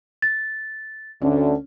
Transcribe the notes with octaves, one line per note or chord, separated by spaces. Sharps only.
A6
D2 D3 C#4